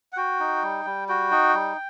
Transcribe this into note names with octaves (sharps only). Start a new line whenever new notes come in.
F#5
F#4 G5
D#4
G3
G3
F#4 G5
D#4
G3